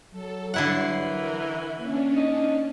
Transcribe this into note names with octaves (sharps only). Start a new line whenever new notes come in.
F#3 A4
G2 D3 E3 E4 F#5 C7
A#4
A#3 C#4 D4
D#4